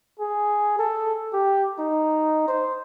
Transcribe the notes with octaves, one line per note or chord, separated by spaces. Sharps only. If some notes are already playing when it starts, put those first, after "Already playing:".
G#4
A4
G4
D#4
C5